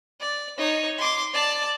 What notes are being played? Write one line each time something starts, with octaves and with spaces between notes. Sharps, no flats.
D5
D#4 C#5
C6 D6
D5 A5